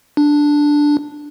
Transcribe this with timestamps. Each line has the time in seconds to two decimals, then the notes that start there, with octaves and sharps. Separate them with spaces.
0.17 D4